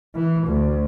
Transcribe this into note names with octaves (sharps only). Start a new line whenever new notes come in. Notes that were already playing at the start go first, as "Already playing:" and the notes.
E3
D2